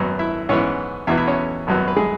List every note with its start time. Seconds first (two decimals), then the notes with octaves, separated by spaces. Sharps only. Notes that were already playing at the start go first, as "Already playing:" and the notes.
Already playing: G#1 F#2 F#3 B3
0.19 E4 E5
0.49 G#2 E3 B3 C#4 C#5
1.07 E2 B2 B3 E4 E5
1.18 E4 E5
1.27 C#4 C#5
1.67 G#1 F#2 F#3 B3
1.88 B4
1.96 G#3 G#4